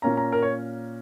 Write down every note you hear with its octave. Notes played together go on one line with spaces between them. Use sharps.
A#2 A#3 C#4 A#5
A#5
A#4
C#5